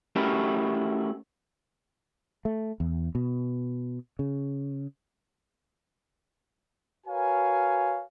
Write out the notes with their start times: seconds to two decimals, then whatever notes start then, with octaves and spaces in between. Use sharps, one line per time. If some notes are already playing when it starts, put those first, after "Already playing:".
0.16 A3 C#4 E4 F#4 G4 A#4
2.45 A3
2.80 E2
3.15 B2
4.19 C#3
7.06 F#4 A#4 B4 C#5 F5 G#5